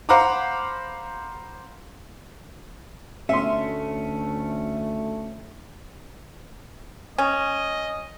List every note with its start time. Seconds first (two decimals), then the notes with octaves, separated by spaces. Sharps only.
0.09 C5 F5 F#5 A#5 B5 D6
3.29 D2 A3 C#4 E5 C6
7.18 C#4 D#5